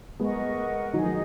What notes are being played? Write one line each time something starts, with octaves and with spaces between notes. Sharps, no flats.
G#3 B3 A#4 D#5 F#5 C#6
D#3 F#3 D#4 G#4 D#5
D#3 F#3